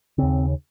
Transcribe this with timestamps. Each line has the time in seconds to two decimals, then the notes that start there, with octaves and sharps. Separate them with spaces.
0.18 D#2 C#3 C4